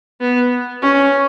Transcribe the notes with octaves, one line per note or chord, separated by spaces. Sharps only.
B3
C#4